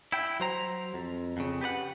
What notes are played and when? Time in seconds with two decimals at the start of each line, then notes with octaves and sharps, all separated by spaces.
0.12 E4 G5
0.40 F#3 C5 A#5
0.94 F2
1.37 F2 C#3
1.61 G4 B4 D5 F#5